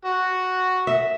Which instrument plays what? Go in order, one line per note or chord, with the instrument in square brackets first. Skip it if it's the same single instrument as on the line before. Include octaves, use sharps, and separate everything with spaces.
[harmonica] F#4
[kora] E5